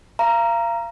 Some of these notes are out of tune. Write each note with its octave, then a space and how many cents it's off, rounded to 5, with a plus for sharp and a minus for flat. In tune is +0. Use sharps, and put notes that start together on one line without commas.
F5 -35 A#5 +0